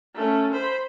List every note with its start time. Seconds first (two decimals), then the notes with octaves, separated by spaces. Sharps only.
0.15 A3 C#4
0.53 C5 B5